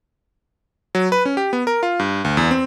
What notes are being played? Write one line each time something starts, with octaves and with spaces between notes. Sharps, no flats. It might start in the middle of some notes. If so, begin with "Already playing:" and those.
F#3
B4
C#4
G4
B3
A#4
F4
G2
D2
E2
C4